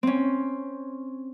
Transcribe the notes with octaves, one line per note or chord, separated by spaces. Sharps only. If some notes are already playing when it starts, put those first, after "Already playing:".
C4 C#4